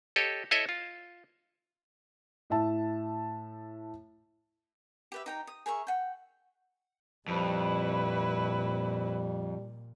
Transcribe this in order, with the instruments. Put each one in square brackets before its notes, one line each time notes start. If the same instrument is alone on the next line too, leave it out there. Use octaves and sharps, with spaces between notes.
[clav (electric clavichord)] G4 A4 C#5 D#5
E4 A4 C#5 D#5 E5
F4
[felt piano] A2 E5 A5
[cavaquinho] G4 B4 E5
D#4 G5 A#5
D#6
G#4 A#4 E5 C#6
F#5 G5
[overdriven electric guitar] F2 [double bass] A#2 [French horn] G3 [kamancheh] E4 B4